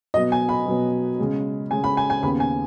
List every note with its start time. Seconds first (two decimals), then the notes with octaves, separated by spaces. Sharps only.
0.14 B2 F#3 B3 D#5
0.32 G#5
0.49 B5
0.66 B2 F#3 B3
1.18 C#3 G#3 C#4
1.70 C#3 G#3 C#4 G#5
1.84 B5
1.97 G#5
2.10 G#5
2.23 D#2 C#3 B3 B5
2.40 G#5